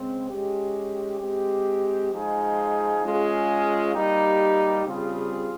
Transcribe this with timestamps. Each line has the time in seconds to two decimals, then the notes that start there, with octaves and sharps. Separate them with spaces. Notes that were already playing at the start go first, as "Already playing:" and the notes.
Already playing: C#3 G#3 C4
0.30 G#3 C#4 G4
1.20 G#3 C4 G4
2.12 F3 G#3 D#4 G#4
3.03 G#3 C#4 F4 G#4
3.94 G3 A#3 D#4 G4
4.84 C#3 G3 C4 F4 G#4